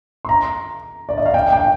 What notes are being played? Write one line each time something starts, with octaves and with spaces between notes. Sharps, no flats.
C6
A#5
D5
D#5
F5
G5
G5